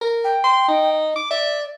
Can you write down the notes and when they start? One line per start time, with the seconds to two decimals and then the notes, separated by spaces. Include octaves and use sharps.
0.01 A#4
0.24 G5
0.44 C6
0.68 D#4
1.16 D6
1.31 D5 E5